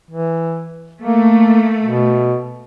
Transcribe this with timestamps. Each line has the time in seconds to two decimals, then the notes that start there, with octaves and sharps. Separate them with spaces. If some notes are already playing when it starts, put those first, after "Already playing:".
0.11 E3
1.02 A3 A#3
1.83 B2